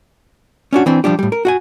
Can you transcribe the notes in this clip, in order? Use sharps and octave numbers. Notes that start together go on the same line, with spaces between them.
C#4 D4 F#4
E3 C4 D4
F3 G3 D4 G4
A2 G3
A#4
F#4 F#5 G#5